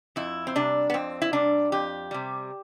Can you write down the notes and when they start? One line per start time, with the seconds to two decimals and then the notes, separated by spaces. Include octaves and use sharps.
0.16 F2 E4
0.47 C4
0.55 C3 G3 D4
0.90 B3
0.94 F2 C4
1.22 E4
1.33 C3 G3 D4
1.72 F2 G4
2.11 C3 G3